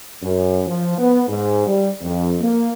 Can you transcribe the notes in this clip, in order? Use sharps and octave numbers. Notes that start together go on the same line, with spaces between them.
F#2
F3
B3
G#2
G3
F2
A#3